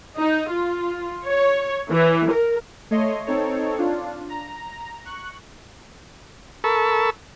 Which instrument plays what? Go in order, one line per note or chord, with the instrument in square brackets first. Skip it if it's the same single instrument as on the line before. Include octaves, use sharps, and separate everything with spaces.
[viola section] D#4
F4
C#5
E3
A#4
[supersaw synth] A3 C#5 D#5 C6
C4 D#4 A4 C#5
D4 F4
A#5
C#6 F#6
[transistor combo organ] A4 A#4 A5 B5 C#6 E6